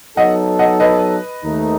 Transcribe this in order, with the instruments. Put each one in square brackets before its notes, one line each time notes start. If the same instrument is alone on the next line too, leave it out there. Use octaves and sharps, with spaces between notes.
[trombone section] F#3 B3 D#4 A4 [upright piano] D#5 F#5
[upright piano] D#5 F#5
B4 D#5
[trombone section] D#2 D#3 A3 D#4